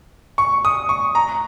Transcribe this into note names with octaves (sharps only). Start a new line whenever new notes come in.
C#6
D#6
C#6
A#5